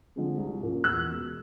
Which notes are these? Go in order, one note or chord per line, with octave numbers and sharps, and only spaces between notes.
D3 F3 G#3 C4
C2
A#2 F3 A#3 C#4
E2 E6 F#6
B2 G#3